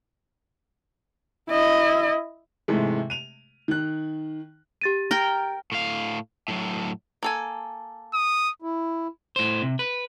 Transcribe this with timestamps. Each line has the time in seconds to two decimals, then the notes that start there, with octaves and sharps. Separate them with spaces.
1.50 E4 D#5
2.68 G#2 C3 E3 G#3 A3
3.10 D#7 F7
3.68 D#3 F#6
4.81 G4 A6 D#7
5.11 A#4 G5
5.72 A2 F5
6.48 A2 F#3
7.23 A#3 A4 G#5
8.14 D#6
8.62 E4
9.36 A2 C5
9.62 C3
9.79 B4